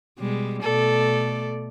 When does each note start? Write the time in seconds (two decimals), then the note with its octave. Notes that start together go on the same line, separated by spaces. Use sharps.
0.19 B2 G3 G#3
0.63 B2 A3 A4 D5